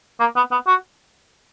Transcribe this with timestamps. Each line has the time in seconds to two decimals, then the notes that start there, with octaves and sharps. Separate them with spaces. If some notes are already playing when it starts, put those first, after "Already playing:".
0.20 A#3
0.36 B3
0.51 B3
0.67 F#4